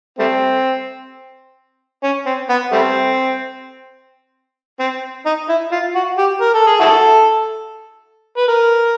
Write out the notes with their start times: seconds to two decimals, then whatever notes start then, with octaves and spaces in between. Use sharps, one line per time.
0.19 G3 A3 C4
2.03 C#4
2.26 C4
2.49 B3
2.72 G3 A3 C4
4.80 C4
5.26 D#4
5.49 E4
5.72 F4
5.95 F#4
6.18 G4
6.41 A#4
6.54 A4
6.67 G#4
6.80 E4 F#4 A4
8.37 B4
8.48 A#4